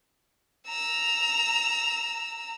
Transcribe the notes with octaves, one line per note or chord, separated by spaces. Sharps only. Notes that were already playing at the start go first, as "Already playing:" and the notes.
A#5 E6